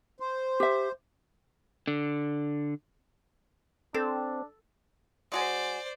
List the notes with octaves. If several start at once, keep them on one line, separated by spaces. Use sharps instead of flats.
C5
G4 E5
D3
C4 D4 A4
G#3 F#4 C5 D5 G#5